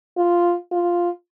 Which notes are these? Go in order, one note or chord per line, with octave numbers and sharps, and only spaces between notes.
F4
F4